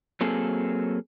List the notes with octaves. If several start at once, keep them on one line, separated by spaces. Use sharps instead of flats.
F#3 A#3 C4 G#4 A4